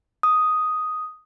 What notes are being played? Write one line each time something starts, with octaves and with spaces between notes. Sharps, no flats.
D#6